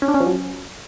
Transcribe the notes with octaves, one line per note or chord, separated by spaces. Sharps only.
C#4
D4
C#4
F3
F#3